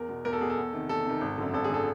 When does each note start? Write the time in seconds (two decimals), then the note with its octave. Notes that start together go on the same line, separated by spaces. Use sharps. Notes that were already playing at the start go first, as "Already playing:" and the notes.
Already playing: E2 A#4
0.09 B2
0.25 E2 A#4
0.33 A4
0.41 B2 G#4
0.50 A4
0.57 E2
0.73 C3 D#3
0.89 E2 A4
1.06 C3 D#3
1.21 G#1
1.38 F#2 D3
1.54 G#1 A4
1.64 G#4
1.70 D3 A4